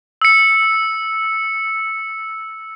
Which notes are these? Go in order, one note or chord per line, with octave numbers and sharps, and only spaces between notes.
E6 C#7